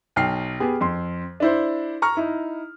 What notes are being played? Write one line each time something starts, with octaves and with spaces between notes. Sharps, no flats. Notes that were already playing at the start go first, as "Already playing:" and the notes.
B1 G5 F6 C7
B3 G4 G#4
F2 C6
D4 E4 C5
A#5 C#6 F6
D#4 E4